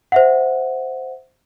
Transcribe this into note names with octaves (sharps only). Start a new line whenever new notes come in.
C5 E5 F#5